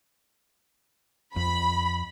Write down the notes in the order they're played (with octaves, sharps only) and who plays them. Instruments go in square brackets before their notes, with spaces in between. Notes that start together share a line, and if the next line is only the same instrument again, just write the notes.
[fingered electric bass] F2 [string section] B5